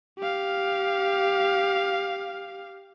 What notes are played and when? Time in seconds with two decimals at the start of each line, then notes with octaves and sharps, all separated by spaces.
0.19 G4 F5